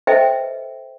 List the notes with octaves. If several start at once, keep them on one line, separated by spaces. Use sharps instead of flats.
A4 B4 C5 D#5 E5 G5